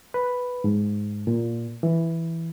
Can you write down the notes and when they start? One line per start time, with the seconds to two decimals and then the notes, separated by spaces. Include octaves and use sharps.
0.14 B4
0.64 G#2
1.27 A#2
1.83 E3